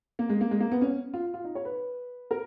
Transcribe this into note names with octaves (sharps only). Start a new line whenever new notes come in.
A#3
G#3
A#3
G#3
A#3
B3
C#4
F4
F4
D#4
C#5
B4
A#4